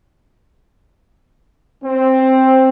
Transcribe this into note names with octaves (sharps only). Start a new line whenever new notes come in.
C4